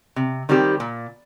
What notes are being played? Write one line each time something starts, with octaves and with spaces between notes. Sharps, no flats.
C3
D#3 G3 C4 G4
A#2